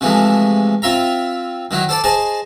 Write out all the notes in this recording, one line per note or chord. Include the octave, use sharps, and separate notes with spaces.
C3 E3 F3 G#3 A3
C4 F4 E5 A#5
D#3 F#3 E4
A4 C5 D5 A5
G#4 C5 D#5 A5